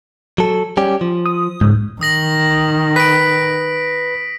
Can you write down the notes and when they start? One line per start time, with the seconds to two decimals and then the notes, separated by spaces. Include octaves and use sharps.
0.38 F#3 A4
0.77 G3 C#4 G4
1.01 F3
1.26 D#6
1.61 C#2 G#2
2.01 D#3 D#6 A#6 F#7
2.96 B4 B6 D7